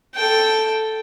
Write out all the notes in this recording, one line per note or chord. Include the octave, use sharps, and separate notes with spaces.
A4 G5